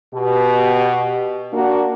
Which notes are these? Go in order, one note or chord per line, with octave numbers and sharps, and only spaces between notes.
B2 G4
A#3 D4 F#4